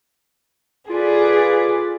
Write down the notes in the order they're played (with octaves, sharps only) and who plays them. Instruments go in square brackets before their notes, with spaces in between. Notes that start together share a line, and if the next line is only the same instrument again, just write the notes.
[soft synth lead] F4 [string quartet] G#4 [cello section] A4 B4 D5